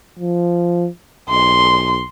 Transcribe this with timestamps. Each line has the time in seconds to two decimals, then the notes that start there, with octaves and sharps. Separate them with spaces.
0.19 F3
1.29 B1 C6